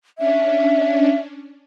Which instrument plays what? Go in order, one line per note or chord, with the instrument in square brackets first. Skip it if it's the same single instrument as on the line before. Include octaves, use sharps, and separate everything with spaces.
[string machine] C#4 D4 [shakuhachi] E5